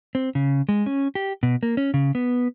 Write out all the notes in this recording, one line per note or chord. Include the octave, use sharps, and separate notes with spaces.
C4
C#3
G#3
C#4
G4
B2
A#3
C#4
C#3
B3